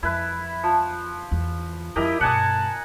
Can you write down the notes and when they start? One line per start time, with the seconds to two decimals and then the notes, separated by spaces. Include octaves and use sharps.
0.03 F2 E4 B4
0.63 F3
1.31 E2
1.96 F2 C#4 E4 G4 A#4 D#5
2.21 G2 B2 F#5 G#5 A5 D#6